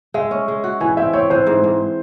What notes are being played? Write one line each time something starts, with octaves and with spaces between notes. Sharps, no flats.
G#3 E5
C#4
G#3
F#4
E3 G#5
C4 E5
C4 C#5
E3 C5
G#2
G#2